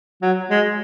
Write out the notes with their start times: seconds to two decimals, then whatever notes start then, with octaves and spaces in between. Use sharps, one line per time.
0.22 F#3
0.50 G#3